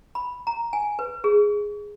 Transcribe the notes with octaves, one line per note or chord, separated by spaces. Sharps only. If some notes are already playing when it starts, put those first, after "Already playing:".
B5
A#5
G#5
B4
G#4